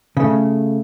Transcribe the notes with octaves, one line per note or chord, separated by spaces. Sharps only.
C#3 A3